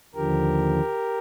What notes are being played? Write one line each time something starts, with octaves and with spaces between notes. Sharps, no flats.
D#2 D3 F3 G4 A#4